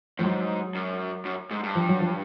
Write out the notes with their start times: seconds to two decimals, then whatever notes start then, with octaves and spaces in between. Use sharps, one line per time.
0.19 A2 F3
0.24 G#2 F#3
0.75 F#2
1.25 F#2
1.51 G#2
1.63 G2
1.75 F3
1.89 F#3
2.01 F3